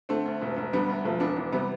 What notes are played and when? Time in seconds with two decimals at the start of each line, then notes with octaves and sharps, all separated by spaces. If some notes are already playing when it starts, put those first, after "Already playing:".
0.09 D3 A3 C4
0.26 D2
0.42 E1
0.57 E1
0.73 D3 G3 B3
0.89 D2
1.04 E1 F3 A3
1.20 E1 B3 D4
1.36 E3 B3 D4
1.52 C3 G3 B3